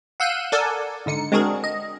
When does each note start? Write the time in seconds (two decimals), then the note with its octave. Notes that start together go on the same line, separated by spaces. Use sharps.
0.20 F5 F#5 E6 F#6 G6 D#7
0.52 A4 A#4 D5 F#5 G#5 A5
1.06 G#2 D3 D#4 C#7
1.32 G#3 C4 D4 F#4 G#4 A#4
1.64 D#5